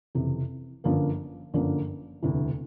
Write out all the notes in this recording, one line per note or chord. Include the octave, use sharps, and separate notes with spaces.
F#1 F2 C3 E3
G1 F#2 D3 F3 A#3
G1 F#2 D3 F3 A#3
E1 D2 C3 E3